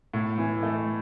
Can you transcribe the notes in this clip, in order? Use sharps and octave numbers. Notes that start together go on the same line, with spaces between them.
A2
E3
A3